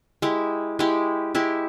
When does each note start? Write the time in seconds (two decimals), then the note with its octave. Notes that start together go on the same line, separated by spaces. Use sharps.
0.22 G#3 E4 G4
0.79 G#3 E4 G4
1.35 G#3 E4 G4